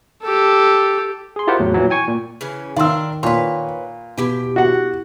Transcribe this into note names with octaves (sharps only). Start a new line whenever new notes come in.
G4 A4
G#4 C6
E4 F4 G4 A#4 C5 F#5
E2 A2 F#3
A#2 E3 F#3
G5 G#5 C#6
A#2
C#3 E3 C#4
D#3 D4 A#4 F5 C6 E6
A#2 B4 C#5 C6
B2 E4 G4 G5
F#4 F#5